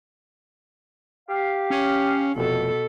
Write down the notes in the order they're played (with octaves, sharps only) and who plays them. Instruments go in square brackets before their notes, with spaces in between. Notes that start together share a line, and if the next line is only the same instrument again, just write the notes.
[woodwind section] G4 F5
[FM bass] C#4
[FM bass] F1 [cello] B2 A4